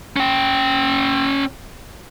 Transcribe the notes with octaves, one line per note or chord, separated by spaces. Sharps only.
C#4 G5